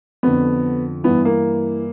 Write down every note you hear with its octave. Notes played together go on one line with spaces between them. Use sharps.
F2 D3 B3
G2 E3 B3
A#3